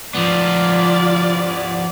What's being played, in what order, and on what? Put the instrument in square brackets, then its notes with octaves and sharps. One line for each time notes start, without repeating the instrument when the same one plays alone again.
[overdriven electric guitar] F3 B3 [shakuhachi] F4 [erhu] D5